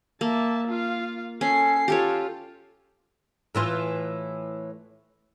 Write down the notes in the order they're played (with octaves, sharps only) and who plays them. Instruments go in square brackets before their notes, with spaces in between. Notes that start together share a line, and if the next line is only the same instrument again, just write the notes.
[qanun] A#3 [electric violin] E5 A5
[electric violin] F4 F5
[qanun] C#4 [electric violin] A4 C7
[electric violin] F4 [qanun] G4 A4 C#5
[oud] A2 E3 F4